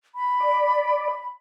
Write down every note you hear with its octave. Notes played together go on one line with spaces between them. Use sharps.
B5
D5